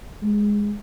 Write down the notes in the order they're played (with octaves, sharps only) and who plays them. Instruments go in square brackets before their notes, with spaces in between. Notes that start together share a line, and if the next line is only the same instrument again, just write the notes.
[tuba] G#3